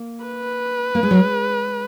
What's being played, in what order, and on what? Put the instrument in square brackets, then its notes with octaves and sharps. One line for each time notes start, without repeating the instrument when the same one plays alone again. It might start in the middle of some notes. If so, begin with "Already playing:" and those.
Already playing: [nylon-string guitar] A#3
[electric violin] B4
[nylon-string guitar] A#3
G#3
F#3
G#3